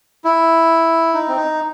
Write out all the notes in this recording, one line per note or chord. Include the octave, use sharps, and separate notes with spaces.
E4
D#4
C4
D#4